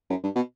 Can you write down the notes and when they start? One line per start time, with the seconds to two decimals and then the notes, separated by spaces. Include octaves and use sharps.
0.10 F#2
0.24 G2
0.36 B2